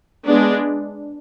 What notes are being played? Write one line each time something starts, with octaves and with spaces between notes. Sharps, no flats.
G#3 B3 D4